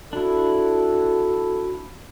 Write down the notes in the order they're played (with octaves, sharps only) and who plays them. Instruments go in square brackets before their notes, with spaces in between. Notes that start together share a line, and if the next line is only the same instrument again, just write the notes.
[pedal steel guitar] D4 E4 [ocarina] F#4 [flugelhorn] A4